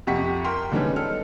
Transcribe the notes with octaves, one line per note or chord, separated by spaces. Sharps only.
F2 C3 G4 F#5 C#6 B6
A#4 G5 C6 F6
D3 D#3 G3 G#3 B3 C#4
D#4 A4 F6